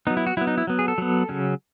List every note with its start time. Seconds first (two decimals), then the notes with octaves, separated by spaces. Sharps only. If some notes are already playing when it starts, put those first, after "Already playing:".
0.07 F#3 B3 D#4
0.17 E4
0.27 F#4
0.37 F#3 E4
0.41 B3
0.47 D#4
0.58 E4
0.67 F#3 B3
0.79 G#4
0.88 A4
0.98 F#3 B3
1.29 C#3 F#3 C#4